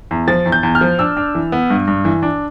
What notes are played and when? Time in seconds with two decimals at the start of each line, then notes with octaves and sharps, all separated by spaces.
0.11 E2
0.28 F3 A6
0.46 E2
0.52 G6
0.63 E2
0.75 F6
0.81 F3
0.99 D4 E6
1.17 D4
1.35 E3
1.52 B3
1.70 G2
1.87 G2
2.05 E3
2.23 D4